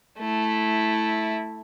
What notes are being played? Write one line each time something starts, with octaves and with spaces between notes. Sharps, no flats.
A3 E4